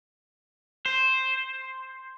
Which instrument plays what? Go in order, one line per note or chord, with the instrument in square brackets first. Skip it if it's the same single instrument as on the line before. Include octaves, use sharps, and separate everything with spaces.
[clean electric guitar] C5